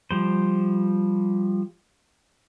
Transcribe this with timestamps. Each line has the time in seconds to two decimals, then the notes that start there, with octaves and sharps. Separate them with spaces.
0.11 F3 G3 C5